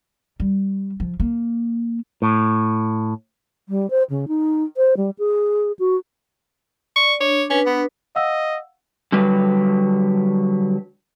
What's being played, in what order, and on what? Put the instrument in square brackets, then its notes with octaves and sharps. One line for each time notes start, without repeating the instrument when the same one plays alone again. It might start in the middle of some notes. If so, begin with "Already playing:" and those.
[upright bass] G3
F3
A#3
[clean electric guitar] A2
[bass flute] G3
C5
C#3
D#4
C5
G3
G#4
F#4
[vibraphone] D5 [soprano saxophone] C#6
[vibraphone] D4 [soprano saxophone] C#5
[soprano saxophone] C#4 [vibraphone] D4 B4
[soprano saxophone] B3
[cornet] D#5 [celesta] F5 F#5 E6
[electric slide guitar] D3 F#3 G3 B4